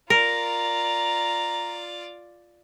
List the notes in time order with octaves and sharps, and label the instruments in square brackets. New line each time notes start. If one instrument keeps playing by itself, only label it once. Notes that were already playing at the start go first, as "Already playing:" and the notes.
[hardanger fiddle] F4 D5 [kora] A#4 [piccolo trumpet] A#5